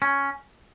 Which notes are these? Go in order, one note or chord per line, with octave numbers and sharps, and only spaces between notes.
C#4